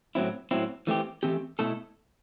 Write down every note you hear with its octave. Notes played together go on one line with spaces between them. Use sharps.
A2 F#3 C4 E4
A2 F#3 C4 E4
E3 A3 C4 G4
E3 A3 C4 G4
B2 A3 E4 A4